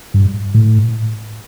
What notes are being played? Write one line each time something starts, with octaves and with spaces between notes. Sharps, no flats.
G2
A2